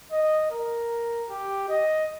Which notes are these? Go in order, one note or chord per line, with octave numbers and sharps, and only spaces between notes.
D#5
A#4
G4
D#5